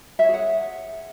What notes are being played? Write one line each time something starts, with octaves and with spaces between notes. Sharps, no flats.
G#4 C#5 E5 F#5